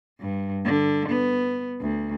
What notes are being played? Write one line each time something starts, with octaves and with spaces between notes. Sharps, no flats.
G2
D3
B3
D2